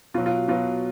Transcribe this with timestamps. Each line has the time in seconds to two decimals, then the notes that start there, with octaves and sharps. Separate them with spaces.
0.14 B2 F4
0.18 F#3
0.26 F4
0.48 B2 F#3 F4